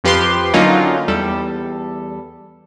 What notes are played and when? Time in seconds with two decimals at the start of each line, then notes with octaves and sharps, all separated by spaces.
0.04 F2 F3 G4 B4 C5 C6
0.54 D3 F#3 A#3 C#4 D#4 F4
1.08 E2 G3 A4